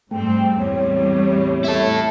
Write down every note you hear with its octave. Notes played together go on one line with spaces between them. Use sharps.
G#2 G3 A3 C4 G5
E2 A2 G3 C4 C#5
E4 A4